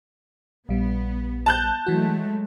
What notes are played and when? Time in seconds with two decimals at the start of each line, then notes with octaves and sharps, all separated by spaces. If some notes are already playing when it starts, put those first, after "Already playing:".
0.69 A#1 G3 B3
1.46 A5 F#6 G6
1.86 E3 F#3 G#3 A3 F#4